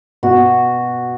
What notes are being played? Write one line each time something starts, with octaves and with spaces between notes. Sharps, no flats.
B2 F#4